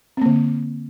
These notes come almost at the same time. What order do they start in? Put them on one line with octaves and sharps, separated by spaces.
C4 A#3 D3